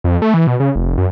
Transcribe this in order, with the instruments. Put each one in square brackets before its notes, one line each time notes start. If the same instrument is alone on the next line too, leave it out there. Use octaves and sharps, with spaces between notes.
[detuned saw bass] F2
A3
E3
B2
C#3
F1
F#2